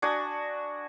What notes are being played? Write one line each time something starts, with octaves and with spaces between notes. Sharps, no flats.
D4 F#4 G#5 D#6